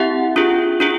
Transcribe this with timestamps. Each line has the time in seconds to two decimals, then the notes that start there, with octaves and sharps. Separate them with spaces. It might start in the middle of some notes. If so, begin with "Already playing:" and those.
Already playing: C4 E4 G4 E5 F#5
0.36 D4 F4 G#4
0.80 D4 F4 G#4